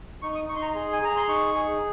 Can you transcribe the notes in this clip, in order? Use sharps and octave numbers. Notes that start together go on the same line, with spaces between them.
D#4 C#6
D#6
D#4 C#6
C6
A#5
G#4 C6
G#5
G#4 A#5
C6
D#4 C#6
G#4